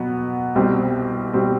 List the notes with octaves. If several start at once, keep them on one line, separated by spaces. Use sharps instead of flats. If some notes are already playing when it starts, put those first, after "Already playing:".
Already playing: B2 F#3 B3
C2 B2 G3 C4
B2 G3 C4